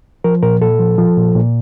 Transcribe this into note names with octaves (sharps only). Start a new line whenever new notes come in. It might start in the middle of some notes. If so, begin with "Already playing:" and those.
F3 A#4
A#2 A#4
A#2 A4
F3
F3
A#2
A#2